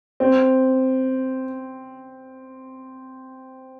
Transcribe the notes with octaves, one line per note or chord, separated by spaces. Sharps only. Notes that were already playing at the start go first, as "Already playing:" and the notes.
C4